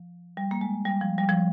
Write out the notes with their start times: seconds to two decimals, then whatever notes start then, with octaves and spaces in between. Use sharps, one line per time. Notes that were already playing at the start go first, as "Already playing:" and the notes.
Already playing: F3
0.37 G3
0.51 A#3
0.61 G#3
0.85 G3
1.01 F3
1.18 G3
1.29 F3